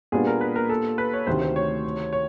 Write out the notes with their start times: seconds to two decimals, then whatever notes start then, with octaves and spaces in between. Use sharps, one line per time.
0.12 A#2 G3 B3 D4 G#4
0.27 A#4
0.41 B4
0.56 A#4
0.69 A4
0.98 B4
1.13 C#5
1.27 D2 C3 D#3 C5
1.41 C5
1.56 C#5
2.13 C#5